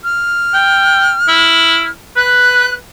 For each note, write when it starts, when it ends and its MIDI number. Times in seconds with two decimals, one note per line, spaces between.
0.04 1.90 89
0.54 1.14 79
1.29 1.88 64
2.16 2.74 71
2.16 2.74 90